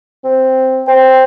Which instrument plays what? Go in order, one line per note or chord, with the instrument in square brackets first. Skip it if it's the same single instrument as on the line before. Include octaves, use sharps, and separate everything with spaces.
[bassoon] C4
[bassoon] C5 [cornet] G5